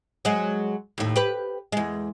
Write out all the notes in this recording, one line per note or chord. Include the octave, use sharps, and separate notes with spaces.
F#3 G#3
D#2 A2
G4 B4
E2 G#3